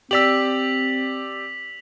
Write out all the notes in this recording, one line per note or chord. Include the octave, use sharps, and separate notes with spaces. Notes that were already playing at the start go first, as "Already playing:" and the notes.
C4 G4 D5 E6 B6 F7 F#7